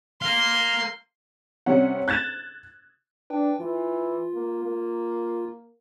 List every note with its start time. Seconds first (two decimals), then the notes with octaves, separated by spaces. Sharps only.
0.22 A#4 F5 C6
1.66 C3 G3 C#4 C#5 F#5
2.08 F#6 G#6 A6 E7
3.30 D4 B4 G5
3.60 E3 F4
4.34 A#3
4.64 A#3